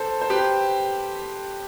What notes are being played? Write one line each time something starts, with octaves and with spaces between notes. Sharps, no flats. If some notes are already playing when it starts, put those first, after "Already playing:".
Already playing: A4 C5
C5
G4 B4